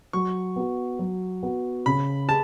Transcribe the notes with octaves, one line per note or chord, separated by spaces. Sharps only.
F#3 C#6
B3 F#4
F#3
B3 F#4
C#3 B5
G#4 A5